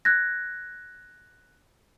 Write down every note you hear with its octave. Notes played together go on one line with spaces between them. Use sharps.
F#6 G#6 A#6